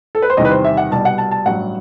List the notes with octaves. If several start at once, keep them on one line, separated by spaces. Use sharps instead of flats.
A4
B4
C5
E2 C3 D#3 G3 D#5
B4
C5
E5
F#5
C2 B2 G3 A5
F#5
A5
A5
A1 G2 F#3 F#5